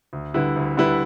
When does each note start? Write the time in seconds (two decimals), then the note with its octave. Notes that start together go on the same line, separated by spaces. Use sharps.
0.13 D2
0.34 D3 G3 E4 B4
0.56 D2
0.77 D3 G3 E4 B4